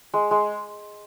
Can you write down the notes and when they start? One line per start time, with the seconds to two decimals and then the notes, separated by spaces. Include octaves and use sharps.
0.14 G#3
0.31 G#3